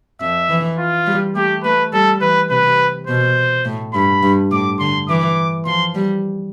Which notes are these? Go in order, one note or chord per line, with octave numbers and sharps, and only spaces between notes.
F2 E5
E3
F4
G3
A3 G4
A3 B4
G3 A4
E3 B4
C3 B4
B2 C5
A2
G2 B5
G2
A2 D6
D3 C6
E3 D6
F3 C6
G3